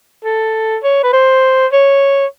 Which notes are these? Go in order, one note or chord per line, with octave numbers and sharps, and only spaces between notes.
A4
C#5
B4
C5
C#5